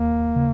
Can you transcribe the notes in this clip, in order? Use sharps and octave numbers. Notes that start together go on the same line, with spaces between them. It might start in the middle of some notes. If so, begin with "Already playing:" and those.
Already playing: D#2 A#3
C#3